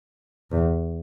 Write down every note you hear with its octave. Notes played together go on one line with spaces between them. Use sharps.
E2